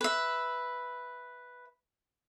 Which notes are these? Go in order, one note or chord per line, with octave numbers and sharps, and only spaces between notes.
B4 E5